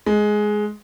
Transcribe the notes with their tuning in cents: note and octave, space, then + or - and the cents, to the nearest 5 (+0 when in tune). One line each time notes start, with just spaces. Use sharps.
G#3 +10